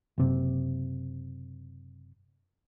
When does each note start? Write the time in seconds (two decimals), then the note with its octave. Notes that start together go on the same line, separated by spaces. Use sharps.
0.18 F#1 C3